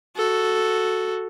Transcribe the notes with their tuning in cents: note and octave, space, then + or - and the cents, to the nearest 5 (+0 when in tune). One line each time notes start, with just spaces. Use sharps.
F#4 +0 A4 +0